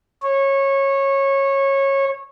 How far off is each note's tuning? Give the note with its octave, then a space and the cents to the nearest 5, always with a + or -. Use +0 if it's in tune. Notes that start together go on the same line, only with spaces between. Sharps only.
C#5 -20